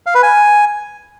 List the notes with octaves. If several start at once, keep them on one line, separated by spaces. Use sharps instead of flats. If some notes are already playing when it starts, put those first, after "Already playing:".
F5
B4
G#5